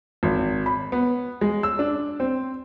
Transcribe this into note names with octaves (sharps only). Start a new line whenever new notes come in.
G#1
B5
B3
G#3
E6
D4
C4